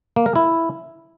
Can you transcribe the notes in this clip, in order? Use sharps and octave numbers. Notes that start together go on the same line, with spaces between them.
A#3
A#4
E4